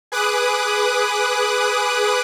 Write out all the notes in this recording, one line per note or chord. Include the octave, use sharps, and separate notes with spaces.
G#4 B4 D6 D#6 F#6